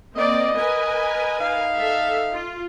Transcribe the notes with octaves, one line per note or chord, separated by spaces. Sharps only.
A#3 C4 D5 D#5
A#4 B4 G#5
D#4 F5
A4 E5
F4